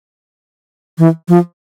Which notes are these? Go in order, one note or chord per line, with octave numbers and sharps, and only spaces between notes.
E3
F3